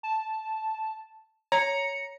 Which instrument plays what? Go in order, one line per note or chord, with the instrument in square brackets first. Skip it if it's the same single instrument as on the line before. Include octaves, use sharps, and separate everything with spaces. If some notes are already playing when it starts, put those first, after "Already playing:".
[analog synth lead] A5
[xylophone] C#5 [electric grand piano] A#5 [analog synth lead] C#7